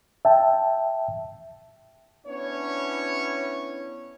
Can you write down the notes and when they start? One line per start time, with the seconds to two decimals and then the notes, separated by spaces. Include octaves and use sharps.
0.25 E5 G5 A5
2.26 B3 C#4 D4 E4 C#5